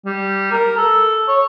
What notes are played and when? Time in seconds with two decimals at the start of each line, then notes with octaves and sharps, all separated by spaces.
0.05 G3
0.52 A#4
0.77 A4
1.28 C#5